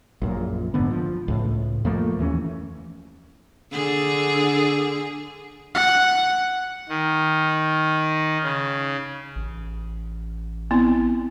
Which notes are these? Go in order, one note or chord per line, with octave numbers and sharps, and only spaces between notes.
A#1 F#2 A#2
F1 G#2 D3 B3
F3
C#2 A2
F2 F3 A3 A#3
D#2 E3 F3 C#4
D3 G#4
F#5
D#3
C#3
A1
B3 C4 E4